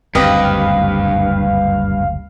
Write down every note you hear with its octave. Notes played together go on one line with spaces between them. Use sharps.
F#1 D2 G2 C4 G4 B4 D#5 F5